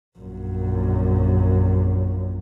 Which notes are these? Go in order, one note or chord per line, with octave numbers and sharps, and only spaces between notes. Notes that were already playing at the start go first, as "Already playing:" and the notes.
A#1 F#2